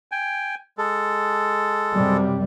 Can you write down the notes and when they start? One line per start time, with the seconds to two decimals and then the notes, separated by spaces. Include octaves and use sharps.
0.12 G5 G#5
0.78 G#3 A4
1.94 F#2 C3 G3